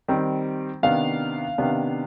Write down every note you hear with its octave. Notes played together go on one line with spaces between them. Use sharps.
D#3 G3 C4
C3 D#3 B3 D4 F5
C3 D#3 B3 D4